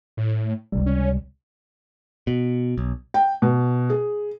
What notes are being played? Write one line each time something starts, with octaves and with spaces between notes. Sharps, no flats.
A2
G1 C#2 C3 G3
C#4
B2
B1
G5
B2
G#4